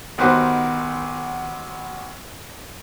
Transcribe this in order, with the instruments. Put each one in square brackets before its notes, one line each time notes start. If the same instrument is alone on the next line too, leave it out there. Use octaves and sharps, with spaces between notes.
[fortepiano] B1 D#3 F#4 G4 B4 C5